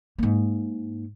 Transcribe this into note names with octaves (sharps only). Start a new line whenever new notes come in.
G#2 A#3